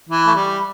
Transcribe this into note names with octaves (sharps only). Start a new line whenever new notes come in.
E3
A3
G3